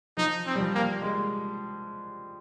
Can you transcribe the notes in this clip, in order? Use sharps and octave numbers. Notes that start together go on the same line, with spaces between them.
F3 D#4
C4
G3
F3
A#3
G#3